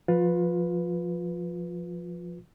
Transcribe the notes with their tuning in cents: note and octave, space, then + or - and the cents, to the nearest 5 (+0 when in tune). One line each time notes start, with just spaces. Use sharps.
F3 +0 F4 +25 B4 +0